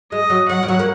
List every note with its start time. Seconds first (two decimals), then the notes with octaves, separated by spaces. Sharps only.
0.12 G#3 D#5
0.30 F#3
0.49 F#3 F#5
0.63 F3
0.68 F#3
0.79 A#3